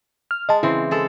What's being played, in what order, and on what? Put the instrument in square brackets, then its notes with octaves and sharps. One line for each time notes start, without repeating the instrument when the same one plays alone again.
[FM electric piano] F6
[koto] G#3 [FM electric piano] D#5 A5
[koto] C#3 E3 C4 [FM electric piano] E4
[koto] G#3 A4